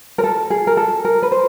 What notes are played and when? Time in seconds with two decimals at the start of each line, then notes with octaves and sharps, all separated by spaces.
0.18 A#4
0.24 A4
0.50 G#4
0.67 A#4
0.77 A4
1.05 A#4
1.23 B4
1.31 C5